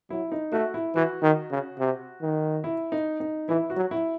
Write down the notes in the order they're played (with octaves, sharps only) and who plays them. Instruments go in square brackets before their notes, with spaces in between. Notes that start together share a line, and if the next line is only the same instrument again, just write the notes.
[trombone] F#3 [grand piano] E4
[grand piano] D#4
[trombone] A3 [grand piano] F#4
[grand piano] E4
[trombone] E3 [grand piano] F#4
[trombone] D#3
C#3
C3
D#3
[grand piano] E4
D#4
D#4
[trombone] E3 [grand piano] E4
[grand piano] F#4
[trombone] F#3
[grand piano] E4